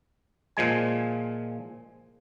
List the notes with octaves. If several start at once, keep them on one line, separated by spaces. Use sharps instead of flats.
A#2 F3 G#3 G#5